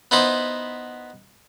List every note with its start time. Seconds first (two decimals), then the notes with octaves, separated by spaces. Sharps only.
0.11 B3 D#4 E4 C5